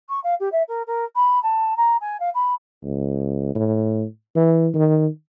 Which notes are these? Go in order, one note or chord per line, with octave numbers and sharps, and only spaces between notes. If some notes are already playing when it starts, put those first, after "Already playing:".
C#6
F5
G4
E5
A#4
A#4
B5
A5
A#5
G#5
F5
B5
C#2
A2
E3
D#3